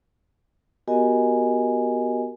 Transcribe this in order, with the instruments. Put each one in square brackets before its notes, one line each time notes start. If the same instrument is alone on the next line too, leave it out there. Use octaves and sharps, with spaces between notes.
[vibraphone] B3 F#4 G4 A#4 D#5 G#5